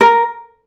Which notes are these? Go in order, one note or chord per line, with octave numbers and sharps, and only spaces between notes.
A#4